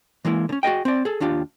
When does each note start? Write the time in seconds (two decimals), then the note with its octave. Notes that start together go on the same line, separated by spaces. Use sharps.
0.25 E3 G#3 A#3 E4
0.49 D3 C#4
0.63 F#4 G#4 D#5 G5
0.85 C4 D5
1.05 G#4 A4
1.20 D#2 D4 F4 G4